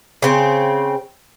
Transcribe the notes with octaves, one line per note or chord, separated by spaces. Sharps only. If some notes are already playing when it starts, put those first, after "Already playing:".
C#3 C4